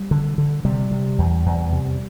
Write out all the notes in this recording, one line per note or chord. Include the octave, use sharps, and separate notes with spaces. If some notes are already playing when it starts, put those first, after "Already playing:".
Already playing: G3
D3
D3
C3 G3
C3
E2
E2
C3